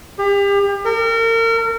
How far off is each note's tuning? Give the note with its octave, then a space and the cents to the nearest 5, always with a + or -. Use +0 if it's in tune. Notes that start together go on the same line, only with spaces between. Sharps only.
G4 +35
A#4 -35